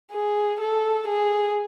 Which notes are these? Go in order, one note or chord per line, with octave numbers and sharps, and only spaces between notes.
G#4
A4
G#4